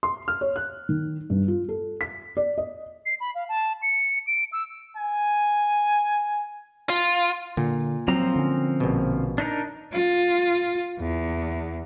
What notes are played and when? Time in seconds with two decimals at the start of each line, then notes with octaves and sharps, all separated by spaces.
0.03 C6
0.28 F6
0.41 C#5
0.56 F#6
0.89 D#3
1.30 G2
1.48 F4
1.69 A4
2.01 B6
2.37 D5
2.58 D#5
3.06 C7
3.20 B5
3.35 F5
3.49 A5
3.82 C#7
4.27 D7
4.52 E6
4.97 G#5
6.90 F4
7.57 A#2 D3
8.08 F3 F#3 C4 A#5
8.36 D3 C#4
8.80 A#1 B2
9.38 D4 D#4 A#4
9.93 F4
10.99 E2